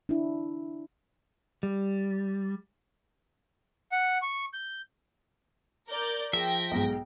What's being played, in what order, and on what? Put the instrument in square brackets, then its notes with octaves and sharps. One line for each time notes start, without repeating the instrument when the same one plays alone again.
[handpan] D4 E4
[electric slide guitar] G3
[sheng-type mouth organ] F#5
C#6
G6
[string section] A#4 D5 G6
[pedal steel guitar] F3 E5 [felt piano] G#4 [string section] G5 A#6
[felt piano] B1 G#2